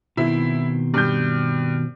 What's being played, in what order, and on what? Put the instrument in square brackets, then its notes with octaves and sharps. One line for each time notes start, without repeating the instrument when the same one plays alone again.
[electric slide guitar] B2 D#3 C4 [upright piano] E4
[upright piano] G2 G6